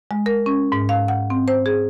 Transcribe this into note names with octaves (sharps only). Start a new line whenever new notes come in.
G#3
A#4
C#4
G#2
F5
F#5
C4
C5
G#4